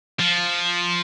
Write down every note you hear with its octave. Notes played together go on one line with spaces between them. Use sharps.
F3